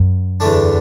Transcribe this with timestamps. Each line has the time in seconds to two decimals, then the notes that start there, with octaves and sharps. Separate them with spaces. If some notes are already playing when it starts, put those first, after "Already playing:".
Already playing: F#2
0.40 E2 D3 A3 D4